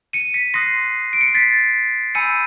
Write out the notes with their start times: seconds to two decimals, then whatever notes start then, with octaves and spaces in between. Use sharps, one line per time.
0.13 C#7 D#7
0.34 B6 C#7
0.54 C6 D#6 F#6 A#6 C7
1.13 D7
1.21 C#7
1.28 C7
1.35 A6 B6
2.15 G#5 B5 E6 G6 C#7 D#7